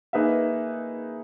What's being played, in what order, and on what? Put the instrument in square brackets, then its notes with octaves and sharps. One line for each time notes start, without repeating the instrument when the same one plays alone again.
[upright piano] A#3 D#4 G#4 B4 E5